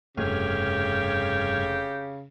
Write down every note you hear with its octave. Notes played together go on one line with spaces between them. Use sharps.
F1 G2 C#3 G4 F6 G#6